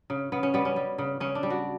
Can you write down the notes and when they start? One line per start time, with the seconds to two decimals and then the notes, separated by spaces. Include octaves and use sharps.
0.10 C#3
0.32 C#3 B3
0.43 C#4
0.54 G3 B3
0.65 C#4
0.76 G3
0.98 C#3
1.20 C#3 C#4
1.35 D4
1.43 G3
1.50 F#4